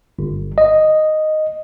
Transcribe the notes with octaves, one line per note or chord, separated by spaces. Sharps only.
G1
D#5